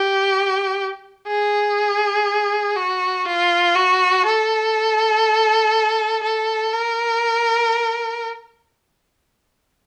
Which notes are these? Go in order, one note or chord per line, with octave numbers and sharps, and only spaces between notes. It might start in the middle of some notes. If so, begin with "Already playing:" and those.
Already playing: G4
G#4
F#4
F4
F#4
A4
A4
A#4